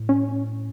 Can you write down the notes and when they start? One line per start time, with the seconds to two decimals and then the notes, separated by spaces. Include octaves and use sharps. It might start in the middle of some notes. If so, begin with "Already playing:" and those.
Already playing: A2
0.09 C#4